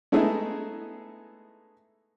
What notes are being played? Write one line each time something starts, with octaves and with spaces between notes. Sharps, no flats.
G#3 A3 B3 D#4 E4 G#4